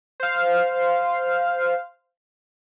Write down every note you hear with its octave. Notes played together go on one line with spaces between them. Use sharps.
C5 F5